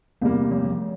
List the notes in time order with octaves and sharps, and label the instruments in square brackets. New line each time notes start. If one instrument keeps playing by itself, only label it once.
[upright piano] E2 C3 G3 A#3 [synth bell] A3
[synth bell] F3
F3